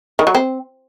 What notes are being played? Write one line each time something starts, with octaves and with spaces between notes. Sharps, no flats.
D#3
F#3
C4